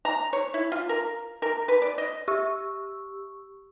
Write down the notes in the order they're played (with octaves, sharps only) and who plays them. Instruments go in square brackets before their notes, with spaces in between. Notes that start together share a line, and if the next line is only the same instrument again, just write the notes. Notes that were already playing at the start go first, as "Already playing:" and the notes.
[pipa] A#5
C#5
E4
F4
A#4
A#4
B4
D5
D#5
[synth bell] G4 C#6 E6